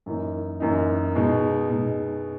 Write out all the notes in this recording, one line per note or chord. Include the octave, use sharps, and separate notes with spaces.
F#2 E3 A#3 D#4
F#2 E3 A#3 D#4
B2 G#3 D#4
B2 G#3 D#4